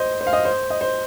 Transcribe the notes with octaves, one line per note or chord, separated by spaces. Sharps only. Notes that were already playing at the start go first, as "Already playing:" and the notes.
Already playing: C5 D#5
C5
F5
D#5
C5
D#5
C5